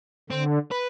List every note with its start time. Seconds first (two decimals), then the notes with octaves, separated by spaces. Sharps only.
0.30 D3 C4
0.72 B4